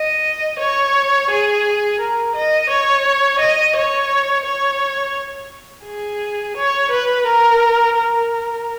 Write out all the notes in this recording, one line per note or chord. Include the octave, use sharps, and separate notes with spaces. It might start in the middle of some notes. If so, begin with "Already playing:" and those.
Already playing: D#5
C#5
G#4
A#4
D#5
C#5
D#5
C#5
C#5
G#4
C#5
B4
A#4
A#4